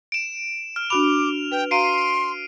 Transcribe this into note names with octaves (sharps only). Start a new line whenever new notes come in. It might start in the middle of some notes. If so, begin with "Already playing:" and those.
D7 E7
F6
D4 F#4 B5 D6 F7
B4 G5
F#4 F5 A#5 C6 C7 D7 D#7